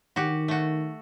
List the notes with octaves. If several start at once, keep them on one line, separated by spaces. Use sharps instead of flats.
D#3 F#4 G4
A3 F#4